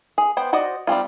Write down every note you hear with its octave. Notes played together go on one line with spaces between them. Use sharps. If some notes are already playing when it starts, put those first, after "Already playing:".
G#4
B3 C5 G5
F#4 C5 D5 D#5
G3 C4 C#4 F4